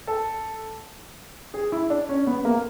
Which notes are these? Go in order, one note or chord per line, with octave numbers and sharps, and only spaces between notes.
A4
G#4
E4
D4
C#4
B3
A#3